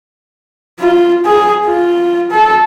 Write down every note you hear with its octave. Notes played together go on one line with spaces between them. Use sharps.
F4
G#4
F4
A4